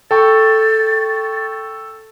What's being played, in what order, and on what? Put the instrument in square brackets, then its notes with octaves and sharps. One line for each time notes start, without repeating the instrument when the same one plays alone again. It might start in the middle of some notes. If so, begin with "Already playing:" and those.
[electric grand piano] A4 G5 C#6 [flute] A6